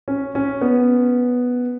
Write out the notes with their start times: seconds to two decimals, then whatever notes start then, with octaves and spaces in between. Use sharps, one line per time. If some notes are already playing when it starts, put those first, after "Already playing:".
0.08 C#4
0.35 C#4
0.61 B3